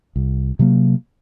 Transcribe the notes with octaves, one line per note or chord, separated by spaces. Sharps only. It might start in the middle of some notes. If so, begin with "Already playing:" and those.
C2
C3 F#3 A#3